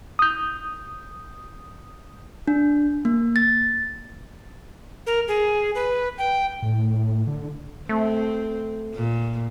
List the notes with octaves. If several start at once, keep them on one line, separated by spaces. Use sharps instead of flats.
D#6 G6
D4
A#3
A6
A#4
G#4
B4
G5
A2
D3
A3 C4
A#2